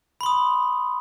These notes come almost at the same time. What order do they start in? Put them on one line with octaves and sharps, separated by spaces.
B5 C6 D#6